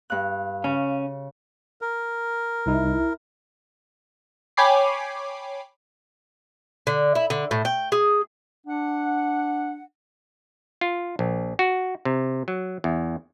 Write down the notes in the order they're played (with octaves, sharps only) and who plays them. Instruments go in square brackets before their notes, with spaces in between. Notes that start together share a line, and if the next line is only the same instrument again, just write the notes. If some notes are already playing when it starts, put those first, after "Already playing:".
[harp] G2 F#6 [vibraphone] F5
[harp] C#3 [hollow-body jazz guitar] C#4
[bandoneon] A#4
[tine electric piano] C2 D#4 [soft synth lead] E4
[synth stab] C#5 G5 G#5 B5 D6 C7
[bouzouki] D3
E4
D3
A2
G5
G#4
[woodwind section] D4 F#5
[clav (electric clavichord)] F4
A#1
F#4
C3
F#3
E2